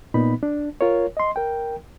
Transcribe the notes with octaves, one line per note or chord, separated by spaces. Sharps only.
A#2 B3 D#4 B5
D4
F4 A#4 C#5
D#5 C6
A#4 G5